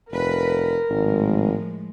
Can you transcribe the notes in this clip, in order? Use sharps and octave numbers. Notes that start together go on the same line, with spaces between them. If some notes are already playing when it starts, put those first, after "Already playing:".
F1 A#4 B4
G#1 A2 F3 G#3